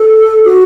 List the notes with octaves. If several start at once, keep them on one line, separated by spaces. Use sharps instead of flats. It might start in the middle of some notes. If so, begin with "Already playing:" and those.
Already playing: A4
F#4